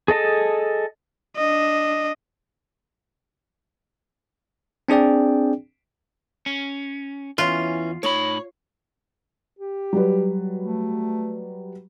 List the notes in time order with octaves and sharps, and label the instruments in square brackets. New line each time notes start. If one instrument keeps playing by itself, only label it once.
[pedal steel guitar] G#4 A4 D#5 A5
[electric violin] D4 D#5
[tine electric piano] C4 D4 G#4 D5 G5
[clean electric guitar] C#4
[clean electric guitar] E2 [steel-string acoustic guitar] E3 C#4 [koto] F4
[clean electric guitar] A2 D#4 B5 [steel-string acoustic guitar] C#5
[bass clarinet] G4
[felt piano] F#3 G3 B4
[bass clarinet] A3